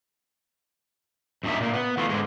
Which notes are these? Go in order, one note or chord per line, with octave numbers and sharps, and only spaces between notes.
F#2 A#2 D4 D#4 E5
A#2 A#3
B3
E3 A3 F4
G#2 D3 D#3 G#3